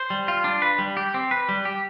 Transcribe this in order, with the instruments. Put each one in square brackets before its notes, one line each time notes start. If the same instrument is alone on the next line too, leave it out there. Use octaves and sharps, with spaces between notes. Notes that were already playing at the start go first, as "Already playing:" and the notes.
Already playing: [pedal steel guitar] C5
G3
F4
D4
B4
G3
G4
C4
B4
G3
G4